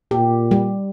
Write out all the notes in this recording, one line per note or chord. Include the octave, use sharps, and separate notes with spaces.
A#2 G4
G3